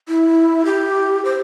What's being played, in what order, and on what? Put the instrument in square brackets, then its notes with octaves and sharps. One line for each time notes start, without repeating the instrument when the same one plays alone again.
[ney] E4
G4
C5